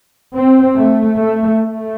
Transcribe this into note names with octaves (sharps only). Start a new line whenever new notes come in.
C4
A3
A3
A3